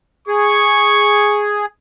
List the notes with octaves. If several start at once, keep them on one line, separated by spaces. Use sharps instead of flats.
G#4 C#6